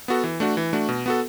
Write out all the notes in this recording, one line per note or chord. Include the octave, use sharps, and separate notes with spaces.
B3 F#4 A4
E3
A3 D4 F#4
E3
A3 D4 F#4
B2
B3 F#4 A4